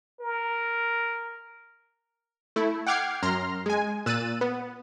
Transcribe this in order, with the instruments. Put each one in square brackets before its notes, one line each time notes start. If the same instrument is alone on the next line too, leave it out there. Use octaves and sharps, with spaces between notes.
[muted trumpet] A#4
[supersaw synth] A3 E4
F#5 G5 D6 F6 G#6 C7
F#2 A#5 C6 F6
G#3 G#5
A#2 E6 F#6 A6 D#7
B3